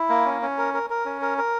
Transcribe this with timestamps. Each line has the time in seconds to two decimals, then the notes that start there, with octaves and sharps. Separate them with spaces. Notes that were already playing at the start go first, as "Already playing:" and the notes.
Already playing: E4
0.09 A#3
0.26 C#4
0.42 C#4
0.58 A#4
0.74 A#4
0.90 A#4
1.05 C#4
1.22 A#4
1.38 A#4